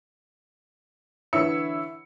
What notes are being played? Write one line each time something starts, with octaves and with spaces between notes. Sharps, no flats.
D3 E3 E4 C#5 E6 C#7